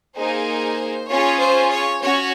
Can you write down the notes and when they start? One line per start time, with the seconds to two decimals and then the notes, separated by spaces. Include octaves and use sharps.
0.16 A#3 D#4 G#4 C5
1.09 C#4 F4 G#4 C#5
1.40 C5
1.71 C#5
2.02 C#4 F#4 C#5